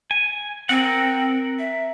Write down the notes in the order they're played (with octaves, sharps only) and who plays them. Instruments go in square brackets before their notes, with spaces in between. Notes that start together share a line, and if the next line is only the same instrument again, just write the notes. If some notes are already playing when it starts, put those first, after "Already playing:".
[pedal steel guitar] G#5
[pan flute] C4 [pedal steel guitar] A#4 F#5
[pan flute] E5